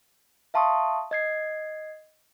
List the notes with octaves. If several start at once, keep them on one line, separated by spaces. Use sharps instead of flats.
E5 F5 A5 C6 C#6 D#6
D#5 G#6 C7